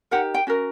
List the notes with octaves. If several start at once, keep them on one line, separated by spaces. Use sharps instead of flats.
D#4 G4 A#4 F#5
G5
C#4 F#4 A#4